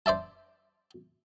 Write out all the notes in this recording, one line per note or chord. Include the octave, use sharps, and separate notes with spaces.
C5 D5 E5 A5